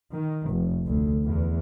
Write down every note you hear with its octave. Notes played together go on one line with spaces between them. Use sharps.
D#3
F1
D2
E2